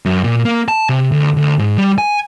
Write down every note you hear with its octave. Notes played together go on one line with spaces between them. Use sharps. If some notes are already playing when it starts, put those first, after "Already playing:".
F#2
A#2
A#3
A5
C3
D2
D2
G#2
G3
G#5